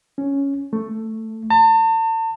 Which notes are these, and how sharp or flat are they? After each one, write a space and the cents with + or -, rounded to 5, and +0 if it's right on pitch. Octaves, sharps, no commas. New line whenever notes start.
C#4 +0
A3 +10
A5 +40